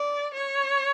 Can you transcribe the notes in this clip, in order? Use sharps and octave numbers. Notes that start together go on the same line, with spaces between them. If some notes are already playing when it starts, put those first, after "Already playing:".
Already playing: D5
C#5